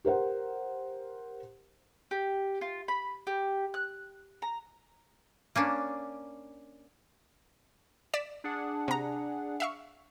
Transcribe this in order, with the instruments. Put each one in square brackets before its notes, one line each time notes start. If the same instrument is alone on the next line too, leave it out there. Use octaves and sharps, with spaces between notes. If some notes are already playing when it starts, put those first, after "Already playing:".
[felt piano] G4 A#4 C5 F#5
[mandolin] G4
F4
B5
G4
F#6
A#5
[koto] A#3 C#4 D4
[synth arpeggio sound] D5 B6 E7
[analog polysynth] D4 G#4 F#5
[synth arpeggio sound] C3 A#5
E5 F5 C#6